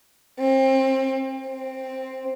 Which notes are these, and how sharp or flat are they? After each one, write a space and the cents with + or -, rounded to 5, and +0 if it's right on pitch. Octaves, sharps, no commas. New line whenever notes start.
C4 +30
C4 +5